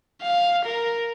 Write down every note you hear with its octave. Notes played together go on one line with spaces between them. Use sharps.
F5
A#4